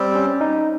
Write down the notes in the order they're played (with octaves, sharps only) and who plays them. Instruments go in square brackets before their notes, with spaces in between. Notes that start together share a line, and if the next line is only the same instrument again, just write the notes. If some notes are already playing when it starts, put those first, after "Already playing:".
Already playing: [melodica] G3 C4
[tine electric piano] C#4
D#4